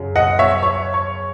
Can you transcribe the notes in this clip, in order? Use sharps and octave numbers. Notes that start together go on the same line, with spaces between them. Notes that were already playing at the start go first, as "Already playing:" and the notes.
Already playing: F#2 C#3 F#3
D#5 F#5
C#5 E5
C#5
C#5